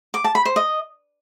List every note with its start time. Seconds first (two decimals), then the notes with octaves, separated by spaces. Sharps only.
0.14 D6
0.24 A5
0.35 B5
0.45 C5
0.56 D#5